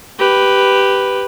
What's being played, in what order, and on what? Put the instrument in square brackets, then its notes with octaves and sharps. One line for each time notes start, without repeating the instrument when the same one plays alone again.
[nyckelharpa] G4 B4